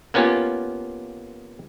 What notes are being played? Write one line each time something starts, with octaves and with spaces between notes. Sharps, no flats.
A#3 B3 C#4 F4 G4